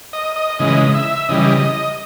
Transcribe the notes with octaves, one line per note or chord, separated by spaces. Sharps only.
D#5
D#5
C#3 E3 G#3 D#5
E5
C#3 E3 G3 D#5